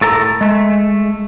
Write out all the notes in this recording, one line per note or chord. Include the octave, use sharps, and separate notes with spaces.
A2 A4 A#4 F5 A#5
G#3 A3